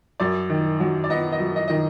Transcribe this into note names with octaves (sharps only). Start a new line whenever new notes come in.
F#2 D5
D#3
F#3
D5
B3 D#5
D#5
F#2
D#5
D#3 D#5